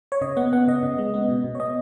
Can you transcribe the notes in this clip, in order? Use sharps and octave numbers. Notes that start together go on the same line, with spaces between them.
C#5
C#3 D#5
B3 F#5
B3 F#5
C#3 D#5
C#3
G#3
B3
B2
B2
C#5
B3 D#5